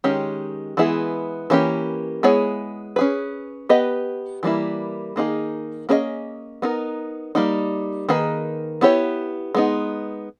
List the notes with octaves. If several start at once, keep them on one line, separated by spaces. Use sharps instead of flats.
D#3 G#3 C#4 G4
E3 G#3 B3 E4 G#4
E3 A#3 C#4 G4
G#3 B3 E4 G#4 C#5
C#4 G#4 B4
B3 G4 B4 D#5
E3 G3 A#3 E4
D#3 A#3 D#4 G#4
A#3 C#4 G#4 B4 D#5
B3 D#4 A#4
G3 A#3 D#4
D#3 A#3 D#4 G#4 B4
B3 E4 G4 C#5
G#3 B3 D#4